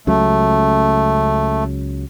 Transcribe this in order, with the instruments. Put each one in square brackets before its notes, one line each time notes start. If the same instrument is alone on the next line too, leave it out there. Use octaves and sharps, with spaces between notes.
[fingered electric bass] C#2 C#3 F#3 [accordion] A3